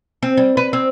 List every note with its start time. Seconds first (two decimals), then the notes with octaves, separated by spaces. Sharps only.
0.23 C4
0.37 G3
0.57 B4
0.73 C4